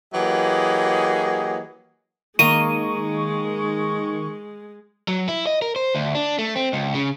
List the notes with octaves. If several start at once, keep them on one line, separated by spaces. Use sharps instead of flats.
E3 F#3 A#3 G4 G#4 D#5
D#3 G#3 A#3 D#5 C#6 D#7
F#3
E4
D#5
A#4
C5
D2
D4
A3
C4
C#2
C#3